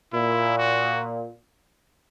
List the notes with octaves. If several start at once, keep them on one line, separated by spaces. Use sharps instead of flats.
A#2 E4
F#4